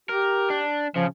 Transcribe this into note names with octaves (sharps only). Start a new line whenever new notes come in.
G4 A#4
D4
C#3 F3